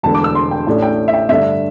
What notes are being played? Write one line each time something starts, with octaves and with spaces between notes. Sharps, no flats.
E1 E2 D3 A3 A5
D6
E6
C6
G5
A1 A2 A3 D4
G5
E5
G5
G2 D3 A3 D4 E5